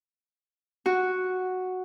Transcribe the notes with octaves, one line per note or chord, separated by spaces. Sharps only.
F#4